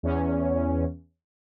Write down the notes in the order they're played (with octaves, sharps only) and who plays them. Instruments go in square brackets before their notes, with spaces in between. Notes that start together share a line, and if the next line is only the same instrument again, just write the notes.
[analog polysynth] E2 C#4